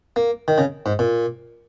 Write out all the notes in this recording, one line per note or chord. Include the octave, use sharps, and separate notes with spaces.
A#3
D#3
C#3
G#2
A#2